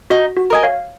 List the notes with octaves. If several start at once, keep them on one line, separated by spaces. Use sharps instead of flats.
D#4 F#4
F#4
A#4 D#5 G#5
C#5 F5